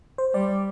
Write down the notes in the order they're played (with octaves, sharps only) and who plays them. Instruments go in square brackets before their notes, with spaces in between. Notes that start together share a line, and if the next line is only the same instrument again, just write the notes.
[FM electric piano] C5
[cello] G3 [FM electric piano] D5